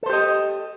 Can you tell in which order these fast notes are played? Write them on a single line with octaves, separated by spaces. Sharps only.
A4 C5 G4 D#5